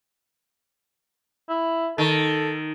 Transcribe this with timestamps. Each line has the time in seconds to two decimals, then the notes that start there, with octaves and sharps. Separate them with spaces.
1.49 E4
1.98 D#3 A4